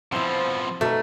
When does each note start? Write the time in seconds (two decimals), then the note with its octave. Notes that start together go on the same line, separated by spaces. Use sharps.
0.12 B2 F3 C4 E4
0.81 B2 A3 D#4